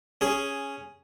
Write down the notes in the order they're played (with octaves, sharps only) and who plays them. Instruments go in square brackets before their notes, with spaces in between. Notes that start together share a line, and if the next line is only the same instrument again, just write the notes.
[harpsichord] C#4 G#4